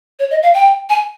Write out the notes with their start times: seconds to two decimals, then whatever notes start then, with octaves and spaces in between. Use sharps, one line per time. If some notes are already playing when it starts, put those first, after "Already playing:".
0.19 C#5
0.31 D#5
0.43 F5
0.54 G5
0.89 G#5